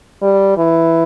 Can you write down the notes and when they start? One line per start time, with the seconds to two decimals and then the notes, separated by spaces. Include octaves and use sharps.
0.22 G3
0.57 E3